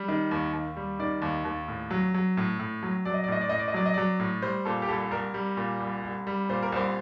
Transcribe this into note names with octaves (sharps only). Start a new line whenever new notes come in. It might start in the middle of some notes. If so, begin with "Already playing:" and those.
Already playing: G3
D#3
D#2
D#2
G3
D#3 D5
D#2
D#2
A2
F#3
F#3
A2
A2
F#3
F#3 D5
D#5
D5
A2 D#5
D5
A2 D#5
D5
D#5
F#3 D5
D#5
F#3 D5
A2
G3 C5
A#2 A4
G4
C2 A4
C2 A#4
G3
A#2
C2
C2
G3
A#2 C5
A#4
C2 C5